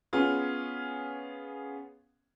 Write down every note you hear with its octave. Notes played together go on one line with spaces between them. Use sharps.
B3 C#4 F4 G#4